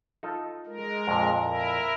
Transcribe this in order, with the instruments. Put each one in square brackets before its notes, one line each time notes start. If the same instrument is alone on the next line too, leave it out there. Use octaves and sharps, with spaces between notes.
[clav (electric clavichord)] D#4 F4 A4
[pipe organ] G#3 A#4
[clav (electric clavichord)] F2 A#2
[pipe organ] E4 A#4